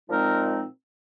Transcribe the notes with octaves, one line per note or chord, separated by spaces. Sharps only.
A#2 F3 G#3 C4 D#4 A#4